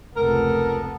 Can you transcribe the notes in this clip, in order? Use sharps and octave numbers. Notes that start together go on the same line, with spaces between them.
F1 C#2 B3 A4 A#4